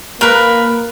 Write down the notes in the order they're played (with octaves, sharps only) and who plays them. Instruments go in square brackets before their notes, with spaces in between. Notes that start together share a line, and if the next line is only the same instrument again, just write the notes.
[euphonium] A#3 [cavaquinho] A#4 B4